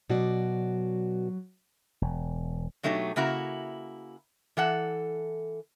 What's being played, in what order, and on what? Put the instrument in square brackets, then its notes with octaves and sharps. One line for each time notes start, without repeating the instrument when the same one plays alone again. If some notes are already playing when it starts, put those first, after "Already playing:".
[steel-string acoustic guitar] B2 F#4 D5 [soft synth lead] F#3
[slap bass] E1
[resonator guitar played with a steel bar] B2 F#3 A3 D#4 G4
C#3 A#3 E4 F#4 A#5
E3 A4 F#5